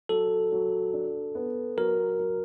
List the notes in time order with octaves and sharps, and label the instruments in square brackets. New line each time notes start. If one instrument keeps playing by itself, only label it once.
[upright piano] F#3 [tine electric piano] A4
[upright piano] F#3
D4
B3
[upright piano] F#3 [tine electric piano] A#4
[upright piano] F#3